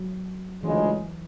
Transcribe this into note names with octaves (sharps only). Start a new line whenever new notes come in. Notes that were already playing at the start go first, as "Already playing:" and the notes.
Already playing: F#3
D2 C#3 E3 F3 G#3